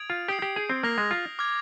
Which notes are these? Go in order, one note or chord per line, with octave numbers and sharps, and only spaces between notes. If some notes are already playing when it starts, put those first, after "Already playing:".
Already playing: D#6 G#6 D7 F7
F4
G4 D#6 G6 C7
G4
G#4
C4
A#3 F6 A#6 F7
G#3
F4
D6 F6 G#6